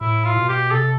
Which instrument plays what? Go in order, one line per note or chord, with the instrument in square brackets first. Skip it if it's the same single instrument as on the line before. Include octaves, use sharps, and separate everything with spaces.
[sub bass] A2 [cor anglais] E4
[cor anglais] F4
[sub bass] B2
[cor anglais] G4
[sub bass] C3 [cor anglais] A4